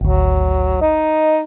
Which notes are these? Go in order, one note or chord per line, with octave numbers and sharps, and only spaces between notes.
G#1 D2 F#3
D#4 D#5